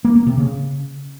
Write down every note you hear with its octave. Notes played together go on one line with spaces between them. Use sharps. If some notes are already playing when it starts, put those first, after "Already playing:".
A#3
A#3
C3
C#3